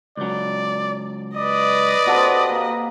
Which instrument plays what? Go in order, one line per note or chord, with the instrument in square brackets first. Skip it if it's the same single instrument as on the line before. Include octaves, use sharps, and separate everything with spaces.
[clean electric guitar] C#2 F#3 [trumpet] D5
[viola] B4 D#5 [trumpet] D5
[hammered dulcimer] C3 C6 [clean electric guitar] F#4 A4
[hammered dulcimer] A#3